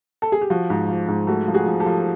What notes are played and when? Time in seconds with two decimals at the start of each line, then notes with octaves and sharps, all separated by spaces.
0.22 A4
0.32 G#4
0.41 G4
0.50 F3 F#4
0.70 G#2
0.89 F3
1.08 G#2
1.27 A3 F#4
1.48 F3
1.54 F#4 G#4
1.66 F3
1.80 G4 A4
1.86 F3